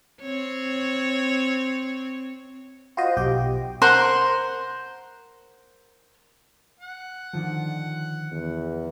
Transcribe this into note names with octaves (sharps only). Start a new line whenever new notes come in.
C4 C#5
F4 F#4 C5 D#5
B1 G4 G5
A#4 C5 F#5 C6
F#5
D3 D#3 F3
E2